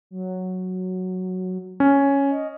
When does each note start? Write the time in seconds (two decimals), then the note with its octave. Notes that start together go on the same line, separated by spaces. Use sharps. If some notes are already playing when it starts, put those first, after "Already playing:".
0.11 F#3
1.80 C#4
2.30 D#5